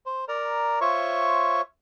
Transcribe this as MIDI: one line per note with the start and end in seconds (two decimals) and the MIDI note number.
0.06 0.25 72
0.28 0.79 70
0.28 0.79 74
0.28 0.79 82
0.81 1.61 65
0.81 1.61 72
0.81 1.61 73
0.81 1.61 76
0.81 1.61 85